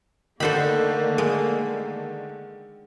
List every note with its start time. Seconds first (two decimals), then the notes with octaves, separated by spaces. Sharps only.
0.40 D3 D#3 A3 A#3 A4 C5 B5
1.18 G#3